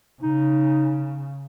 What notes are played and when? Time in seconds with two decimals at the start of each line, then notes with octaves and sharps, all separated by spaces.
0.22 C#3 D#4